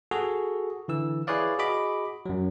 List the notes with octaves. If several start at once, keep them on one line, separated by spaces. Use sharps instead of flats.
F#4 G#4 A4
D3 E3 E6
E4 G#4 B4 C#5 D5 F5
F#4 G#4 D#5 B5 D6
F#2 F#3